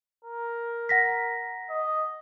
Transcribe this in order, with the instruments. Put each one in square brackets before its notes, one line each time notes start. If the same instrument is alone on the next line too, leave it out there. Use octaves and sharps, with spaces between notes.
[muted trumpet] A#4
[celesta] F#5 A#6 B6
[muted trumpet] D#5